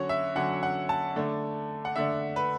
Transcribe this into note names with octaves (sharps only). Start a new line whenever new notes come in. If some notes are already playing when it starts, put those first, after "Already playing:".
Already playing: D3 F#3 C#4 F#4 C#5
E5
D3 F#3 C#4 F#5
F#5
A5
D3 A3 D4
F#5
D3 A3 D4 E5
B4